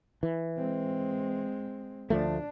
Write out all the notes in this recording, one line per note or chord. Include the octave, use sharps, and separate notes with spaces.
E3
G#3 C4
D2 F3 A3 D4